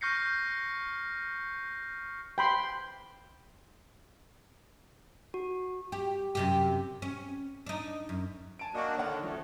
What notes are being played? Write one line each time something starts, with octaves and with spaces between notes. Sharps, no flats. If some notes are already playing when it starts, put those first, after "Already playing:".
C#6 F6 G6 A#6 C7 C#7
G5 B5 C6
F#4
G4
F#2 C3 G4
C#4
D4 D#4
F#2
G#5 A5 D7
A#3 D4 F#4 D#5 C#6
D3 D#3 C#5 D5 F#5
D2 F3 A3 C#4